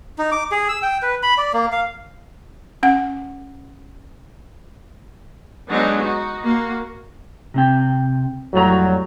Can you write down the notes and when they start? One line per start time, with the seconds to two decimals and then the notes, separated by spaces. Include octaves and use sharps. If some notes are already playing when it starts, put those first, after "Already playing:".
0.18 D#4
0.32 D6
0.52 G#4
0.69 E6
0.83 G5
1.02 B4
1.23 B5
1.38 D5
1.53 A#3
1.72 F5
2.83 C#4 F#5
5.69 F#3 G#3 B3 D4 D#4
6.00 D#4 F#4
6.43 A#3 F#4
7.54 C3 C4 G5
8.54 F2 A2 F#3 G3 A#5